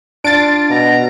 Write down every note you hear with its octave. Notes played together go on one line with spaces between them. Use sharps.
D4 F4 A6 D7
B2 A#5